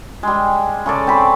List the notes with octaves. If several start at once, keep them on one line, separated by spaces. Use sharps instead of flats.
G3 G#3
C#3 A4 D5
C4 B5